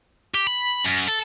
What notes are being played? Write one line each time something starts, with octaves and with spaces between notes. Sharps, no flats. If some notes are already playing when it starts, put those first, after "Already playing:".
G4
B5
F#2
A4